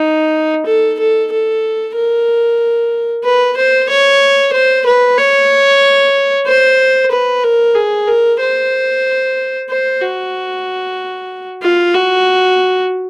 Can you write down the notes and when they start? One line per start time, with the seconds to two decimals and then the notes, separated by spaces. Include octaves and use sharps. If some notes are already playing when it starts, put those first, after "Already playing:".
Already playing: D#4
0.66 A4
0.99 A4
1.32 A4
1.95 A#4
3.24 B4
3.57 C5
3.89 C#5
4.53 C5
4.86 B4
5.17 C#5
6.46 C5
7.11 B4
7.43 A#4
7.75 G#4
8.07 A#4
8.41 C5
9.69 C5
10.01 F#4
11.62 F4
11.94 F#4